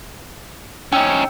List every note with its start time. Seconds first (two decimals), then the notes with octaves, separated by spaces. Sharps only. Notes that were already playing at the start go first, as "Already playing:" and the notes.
0.93 C#4 D#4 G5 E6